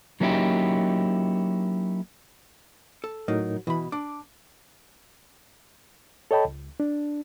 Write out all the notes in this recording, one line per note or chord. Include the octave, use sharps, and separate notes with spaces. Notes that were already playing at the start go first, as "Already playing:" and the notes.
F#3 A#3 C#4 D#4 E4 G4
A4
A2 F#3 D#4 A#4
B2 E3 B5
D4 D6
A4 C#5 D#5 G5 A5 B5
C#2
D4